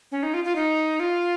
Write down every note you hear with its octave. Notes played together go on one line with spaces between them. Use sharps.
C#4
D#4
F4
F4
D#4
F4